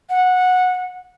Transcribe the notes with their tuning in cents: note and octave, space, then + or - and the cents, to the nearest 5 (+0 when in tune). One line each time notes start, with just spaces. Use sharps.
F#5 -15